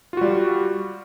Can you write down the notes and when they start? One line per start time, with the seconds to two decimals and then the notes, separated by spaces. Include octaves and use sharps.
0.13 F4
0.17 F#4
0.21 G3